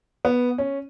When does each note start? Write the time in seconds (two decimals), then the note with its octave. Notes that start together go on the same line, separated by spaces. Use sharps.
0.25 B3
0.58 C#4